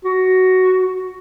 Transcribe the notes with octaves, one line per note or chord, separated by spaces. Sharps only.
F#4